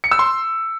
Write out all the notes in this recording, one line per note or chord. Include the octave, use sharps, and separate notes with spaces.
C#7
E6
C6